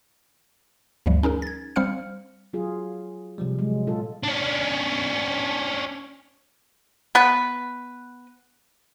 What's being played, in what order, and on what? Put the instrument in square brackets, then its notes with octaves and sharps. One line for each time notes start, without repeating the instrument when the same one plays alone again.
[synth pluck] D2 G2 F3 G3 A3
C#4 D#4 G#4 A#4
G#6 A6
G3 C4 C5 F5 F6 C#7
[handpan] F#3 F4 G#4
[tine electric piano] C3 F3 G3
[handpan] F#3 G#3
A#2 F4 A4
[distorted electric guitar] C#4 D4
[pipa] B3 B4